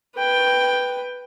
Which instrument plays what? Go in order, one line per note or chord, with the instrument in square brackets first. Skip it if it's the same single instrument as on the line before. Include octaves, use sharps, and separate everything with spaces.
[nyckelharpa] B4 G5